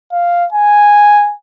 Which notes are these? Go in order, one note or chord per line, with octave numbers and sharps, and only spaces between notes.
F5
G#5